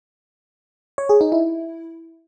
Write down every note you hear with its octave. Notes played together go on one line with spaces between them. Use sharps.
C#5
G#4
D#4
E4